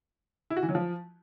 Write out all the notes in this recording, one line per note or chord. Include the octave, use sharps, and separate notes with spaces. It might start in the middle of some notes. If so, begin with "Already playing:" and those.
E4
F#4
E3
F#3
F3